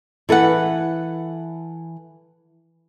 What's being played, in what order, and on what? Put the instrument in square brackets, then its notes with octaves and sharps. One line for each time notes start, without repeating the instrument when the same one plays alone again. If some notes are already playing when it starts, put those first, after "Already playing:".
[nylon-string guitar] E3 A4 B4 F#5